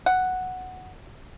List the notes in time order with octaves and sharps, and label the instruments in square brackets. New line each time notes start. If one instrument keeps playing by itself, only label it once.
[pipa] F#5